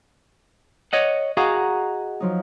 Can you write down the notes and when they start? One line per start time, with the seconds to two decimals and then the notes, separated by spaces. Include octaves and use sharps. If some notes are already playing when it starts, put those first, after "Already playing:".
0.93 C#5 D#5 F#5
1.37 F#4 G#4 D#5 F5 F#5 A#5
2.20 F3 F#3 D#4